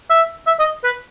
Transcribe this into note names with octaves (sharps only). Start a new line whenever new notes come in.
E5
E5
D#5
B4